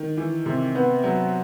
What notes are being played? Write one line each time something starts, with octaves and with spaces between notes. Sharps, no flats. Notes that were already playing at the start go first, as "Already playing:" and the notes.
Already playing: D#3
E3
C3
B3
F#3